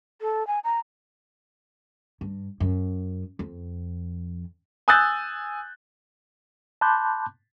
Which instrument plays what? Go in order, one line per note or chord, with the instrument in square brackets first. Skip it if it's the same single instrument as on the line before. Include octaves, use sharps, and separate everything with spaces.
[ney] A4
G#5
A#5
[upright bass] G2
F#2
F2
[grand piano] G#5 D#6 E6 F#6 G6 A6
[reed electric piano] A5 B5 C6 D6 F#6 G6